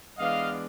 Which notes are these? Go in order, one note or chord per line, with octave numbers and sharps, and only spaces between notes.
E3 G#3 B3 D4 D#5 F5